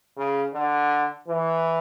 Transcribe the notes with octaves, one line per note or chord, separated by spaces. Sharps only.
C#3
D3
E3